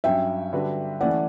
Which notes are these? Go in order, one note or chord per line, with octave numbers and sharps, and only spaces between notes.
G2 F#3 C#4 E5 G5
D3 G3 D4 F#4 B4
E3 A3 C#4 E4 D5 F#5